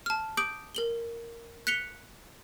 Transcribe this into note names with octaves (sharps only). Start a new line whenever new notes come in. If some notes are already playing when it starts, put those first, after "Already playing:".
A5 F6
D6 D#6 G6 D7 F#7
A#4 F#7 G7
F#6 B6 C#7 F7 G7